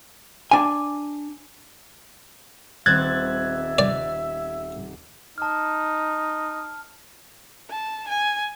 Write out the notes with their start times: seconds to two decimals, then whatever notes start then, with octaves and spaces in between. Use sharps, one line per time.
0.51 D4 G#5
2.86 D#1 C4 E5 F#6 G#6 A6 E7
3.79 D5
5.38 D#4 A5 F6
7.70 A5
8.08 G#5